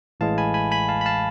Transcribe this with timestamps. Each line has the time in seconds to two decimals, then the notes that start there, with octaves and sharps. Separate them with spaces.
0.20 A1 A2 E3 G#3 F5 A5
0.38 G#5 B5
0.54 G#5 B5
0.71 G#5 B5
0.89 F5 A5
1.01 B5
1.06 F5 A5